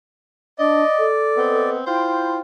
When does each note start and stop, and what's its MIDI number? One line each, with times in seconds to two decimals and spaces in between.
0.59 0.83 62
0.59 1.70 74
0.59 1.07 75
0.98 1.73 69
1.37 1.81 59
1.37 1.81 60
1.37 1.81 75
1.87 2.38 64
1.87 2.40 65
1.87 2.40 72
1.87 2.40 79